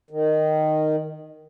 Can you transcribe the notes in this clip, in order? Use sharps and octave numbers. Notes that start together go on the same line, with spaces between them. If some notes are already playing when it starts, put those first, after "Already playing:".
D#3